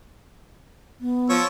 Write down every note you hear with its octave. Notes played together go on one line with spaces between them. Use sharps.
B3
F3 C#5 E6